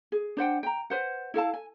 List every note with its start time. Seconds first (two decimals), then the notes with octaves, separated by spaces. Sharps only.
0.12 G#4
0.37 D4 C5 F#5 G5
0.63 G5 A#5
0.90 B4 C5 F#5
1.34 E4 A4 F5 A5
1.54 G#5